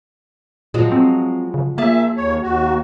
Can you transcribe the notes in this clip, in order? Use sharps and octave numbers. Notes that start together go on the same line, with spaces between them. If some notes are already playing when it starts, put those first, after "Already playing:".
A#2 F3 F#3 G#3
C4
C#3
A#2 A#3 G#4 E5 A5
D#2 C#5
D#2 F#4